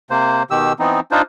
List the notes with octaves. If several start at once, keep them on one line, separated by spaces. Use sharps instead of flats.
C3 A#3 C5
B2 D#3 G4 E6
E3 B3 C4 D#4
D4 D#4 F4 C5